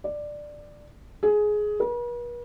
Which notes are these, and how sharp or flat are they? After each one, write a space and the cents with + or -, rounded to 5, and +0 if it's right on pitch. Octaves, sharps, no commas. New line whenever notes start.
D5 +10
G#4 +15
B4 -45